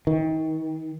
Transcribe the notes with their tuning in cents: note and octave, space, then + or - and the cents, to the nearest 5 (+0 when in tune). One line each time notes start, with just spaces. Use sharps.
D#3 +35